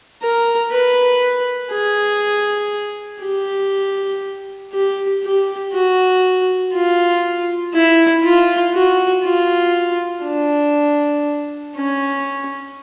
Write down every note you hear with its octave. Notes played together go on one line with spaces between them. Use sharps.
A#4
B4
G#4
G4
G4
G4
F#4
F4
E4
F4
F#4
F4
D4
C#4